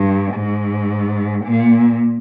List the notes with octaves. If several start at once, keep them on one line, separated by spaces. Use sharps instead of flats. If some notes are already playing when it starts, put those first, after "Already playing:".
Already playing: G2
G#2
A#2